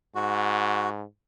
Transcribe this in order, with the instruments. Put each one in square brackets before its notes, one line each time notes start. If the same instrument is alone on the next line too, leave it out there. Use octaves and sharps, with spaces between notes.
[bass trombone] G#2 [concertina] F#4